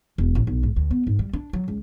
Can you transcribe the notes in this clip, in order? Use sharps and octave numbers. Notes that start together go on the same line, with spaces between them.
E1
A1
B1
G#2
D2
B3
G#2
G3
D4
F#3
C#2